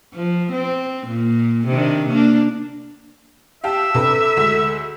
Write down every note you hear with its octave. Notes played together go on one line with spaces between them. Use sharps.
F3
C4
A#2
C3 D#3 D4
A#3 D4
G4 E5 F5 G5 A5
C3 D4 A4 B4
D2 G#3 B6